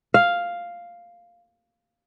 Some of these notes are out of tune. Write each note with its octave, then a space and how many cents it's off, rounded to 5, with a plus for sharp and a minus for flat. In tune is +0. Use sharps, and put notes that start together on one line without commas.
F5 +0